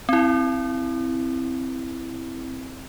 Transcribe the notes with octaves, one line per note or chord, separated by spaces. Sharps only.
C4 E4